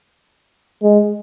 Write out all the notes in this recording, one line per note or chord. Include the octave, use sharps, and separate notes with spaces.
G#3